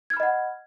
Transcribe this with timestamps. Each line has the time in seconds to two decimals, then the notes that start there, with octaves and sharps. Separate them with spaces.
0.10 G#6
0.13 F6
0.17 B5
0.20 D#5
0.23 F#5